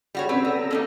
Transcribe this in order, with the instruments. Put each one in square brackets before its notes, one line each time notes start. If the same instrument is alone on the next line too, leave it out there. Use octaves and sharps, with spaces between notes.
[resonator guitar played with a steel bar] G3 F#4 C#5 [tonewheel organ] G#4
[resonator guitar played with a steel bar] C4 B4 [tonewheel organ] C#4
[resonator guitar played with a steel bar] B3 [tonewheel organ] A4 A#5 E6
[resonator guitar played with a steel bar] A#3 C#4 D#4